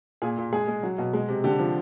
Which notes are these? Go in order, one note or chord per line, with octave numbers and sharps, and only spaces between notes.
A#2 G#4
A#2
G#3 G#4
G#3
F#3
B2
G#3
C3
D3 G4
F3